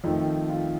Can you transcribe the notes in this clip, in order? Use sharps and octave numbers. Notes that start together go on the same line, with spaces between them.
F2 D#3 A3 D#4
F4